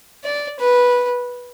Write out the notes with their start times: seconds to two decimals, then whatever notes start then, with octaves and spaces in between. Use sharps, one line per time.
0.24 D5
0.60 B4